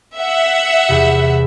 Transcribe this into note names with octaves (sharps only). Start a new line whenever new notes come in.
E5 F#5
E2 C3